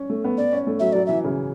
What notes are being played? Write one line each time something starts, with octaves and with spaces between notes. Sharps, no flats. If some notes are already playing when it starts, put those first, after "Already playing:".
Already playing: C#4
A3
B3
B3 D5
C#4
A3
F#3 E5
F#3 D5
E3 E5
C#3